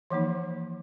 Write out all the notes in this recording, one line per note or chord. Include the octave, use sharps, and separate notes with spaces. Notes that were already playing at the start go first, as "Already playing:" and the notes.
E3 F3 A#3 D#4